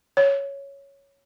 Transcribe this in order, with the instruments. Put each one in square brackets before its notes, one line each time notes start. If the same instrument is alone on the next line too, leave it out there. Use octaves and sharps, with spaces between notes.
[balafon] C#5